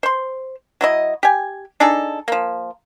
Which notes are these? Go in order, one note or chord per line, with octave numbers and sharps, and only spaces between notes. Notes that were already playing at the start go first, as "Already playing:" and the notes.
C5 C6
F#3 E4 D#5
G4 G#5
D4 D#4 G#4 A4
F3 A#3